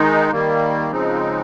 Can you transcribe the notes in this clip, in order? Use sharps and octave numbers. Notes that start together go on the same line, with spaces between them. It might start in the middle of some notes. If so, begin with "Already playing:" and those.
Already playing: D#3 G#3 D#4
D#3 G3 A#3
C#3 F3 G#3 C4 D#4